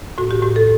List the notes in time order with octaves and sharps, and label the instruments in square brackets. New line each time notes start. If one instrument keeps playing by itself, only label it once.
[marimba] A2 F#4
G4
A2 G4
A4